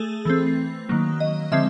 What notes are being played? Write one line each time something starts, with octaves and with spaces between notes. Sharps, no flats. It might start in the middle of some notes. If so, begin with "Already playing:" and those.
Already playing: A3 G#4 A4
E3 A3 C4
D#3 F#3 A#3
D#5
D3 F3 G#3 C4 E5